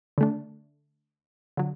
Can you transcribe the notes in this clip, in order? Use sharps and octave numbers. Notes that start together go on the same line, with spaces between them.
D3 A3 D4
D3 F#3